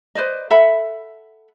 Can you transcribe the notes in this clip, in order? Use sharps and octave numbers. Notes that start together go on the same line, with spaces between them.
B4 C5 D5 D#5
A4 E5 F#5 B5